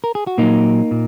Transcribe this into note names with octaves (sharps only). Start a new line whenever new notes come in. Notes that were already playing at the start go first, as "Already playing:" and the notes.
A#4
G#4
F#4
A#2 F#3 A#3 D#4
A#2